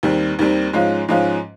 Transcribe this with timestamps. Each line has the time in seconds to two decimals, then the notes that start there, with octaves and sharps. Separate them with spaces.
0.03 D#2 D#3 G3 C4
0.39 D#2 D#3 G3 C4
0.73 G#2 F3 G#3 C#4 F4
1.08 G#2 F3 G#3 C#4 F4